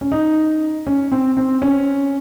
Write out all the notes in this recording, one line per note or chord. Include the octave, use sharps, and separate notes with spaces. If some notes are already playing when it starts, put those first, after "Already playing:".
C#4
D#4
C#4
C4
C4
C#4